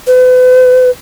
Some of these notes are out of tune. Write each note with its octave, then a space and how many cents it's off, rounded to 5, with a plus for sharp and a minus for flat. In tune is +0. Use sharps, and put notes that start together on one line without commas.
B4 +40